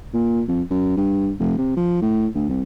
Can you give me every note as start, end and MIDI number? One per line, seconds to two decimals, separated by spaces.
0.14 0.42 46
0.48 0.62 41
0.70 0.94 42
0.97 1.32 43
1.40 1.57 29
1.58 1.76 48
1.77 1.99 53
2.02 2.27 45
2.35 2.47 38
2.49 2.63 36